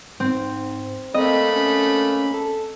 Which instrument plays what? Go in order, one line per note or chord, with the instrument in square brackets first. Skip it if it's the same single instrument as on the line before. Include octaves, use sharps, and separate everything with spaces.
[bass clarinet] G#2 [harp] C4
[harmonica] A3 A#3 B5 [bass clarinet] C4 [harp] D#5
[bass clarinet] C#4
A4